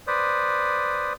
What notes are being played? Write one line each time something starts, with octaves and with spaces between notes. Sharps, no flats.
B4 C5 D5 D#6